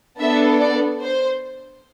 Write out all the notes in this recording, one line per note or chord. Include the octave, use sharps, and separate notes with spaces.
B3 D4 A4 E5
D5
C5